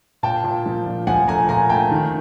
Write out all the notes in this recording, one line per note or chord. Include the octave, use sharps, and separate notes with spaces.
A#2 G5 A5
A#2
F3
A#2
F3 F#5 G#5
A3 G#5 A#5
A#2 G#5 A#5
A3 G5 A5
D#3